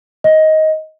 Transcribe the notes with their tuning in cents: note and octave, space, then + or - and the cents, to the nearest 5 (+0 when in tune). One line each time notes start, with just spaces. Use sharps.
D#5 +15